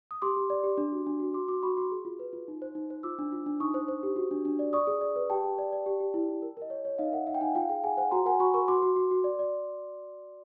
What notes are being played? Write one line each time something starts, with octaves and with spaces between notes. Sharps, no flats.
D#6
G4 C6 D6
G4
D5
G4
D4
F#4
D4
F#4
F#4 C6 D6
F#4 C6 D6
F#4 B5 C#6
F#4 C6 D6
G#4
F4
B4
F4
D#4
C5
D#4
C5
F4 D6 E6
D4
F4
D4
D#4 C#6 D#6
C5
C5
G4
F#4
D4
D4
D5
D5 C#6 D#6
G#4
D5
B4
G4 G5 A5
G4
D5
D5
G4
G4
E4
E4
A#4
A#4 D#5
C#5
C#5
D#4 D#5 F5
A#4 E5 F#5
D#4 E5 F#5
G5
D#4 F#5 G#5
F4 F5 G5
G#4 F5 G5
G#4 F#5 G#5
C5 F#5 G#5
F#4 A#5 C6
A#4 F#5 G#5
F#4 B5 C#6
A#4 B5 C#6
F#4 C6 D6
F#4
F#4
F#4
D5
D5